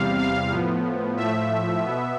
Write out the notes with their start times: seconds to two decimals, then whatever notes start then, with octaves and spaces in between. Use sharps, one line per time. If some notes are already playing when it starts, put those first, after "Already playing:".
Already playing: E2 C3 G3 F5
0.19 F5
0.51 A2 F3 B3
1.17 A2 F3 A3 E5
1.82 B2 B3